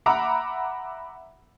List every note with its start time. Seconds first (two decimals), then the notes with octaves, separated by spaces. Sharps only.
0.06 E5 F#5 A#5 B5 D6